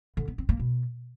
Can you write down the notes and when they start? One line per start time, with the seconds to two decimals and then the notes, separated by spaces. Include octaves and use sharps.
0.17 D3
0.28 B3
0.38 C4
0.49 A#3
0.59 B2